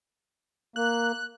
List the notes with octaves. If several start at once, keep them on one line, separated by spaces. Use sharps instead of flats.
A#3 F#6